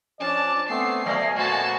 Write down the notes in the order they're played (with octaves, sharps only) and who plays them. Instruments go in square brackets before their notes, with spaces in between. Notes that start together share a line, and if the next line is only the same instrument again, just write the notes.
[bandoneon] F3 C#4 D4 [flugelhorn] D5 [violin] A5
[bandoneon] A3 B3 C4 [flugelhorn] G#5 [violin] C7
[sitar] F#3 A3 [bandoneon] D#5 F5
[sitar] B2 A#3 C5 [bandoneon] A3 [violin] F#4 A5